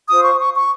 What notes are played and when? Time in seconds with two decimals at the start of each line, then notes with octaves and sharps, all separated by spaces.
0.09 F4 C5 D#6
0.24 C#6
0.40 C#6
0.55 C#6